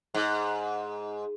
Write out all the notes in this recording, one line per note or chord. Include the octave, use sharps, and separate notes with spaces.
G#2